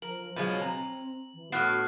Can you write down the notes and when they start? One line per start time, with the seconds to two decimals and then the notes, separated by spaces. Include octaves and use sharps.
0.02 F3 A#4 F#7
0.36 B2 F3 F#3 G#3
0.62 C4 A#5
1.34 E3
1.52 A2 B3 F#4 F6 F#6 C7